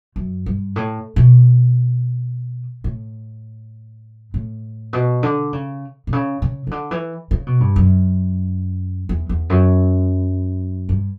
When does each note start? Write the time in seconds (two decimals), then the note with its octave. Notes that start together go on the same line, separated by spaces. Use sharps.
0.16 F#2
0.46 G2
0.76 A2
1.16 B2
2.84 A2
4.34 A2
4.93 B2
5.23 D3
5.53 C#3
6.07 B2
6.13 C#3
6.42 C#3
6.67 C#3
6.71 D3
6.91 E3
7.31 C#3
7.47 B2
7.60 G2
7.76 F#2
9.09 E2
9.29 E2
9.50 F#2
10.89 G2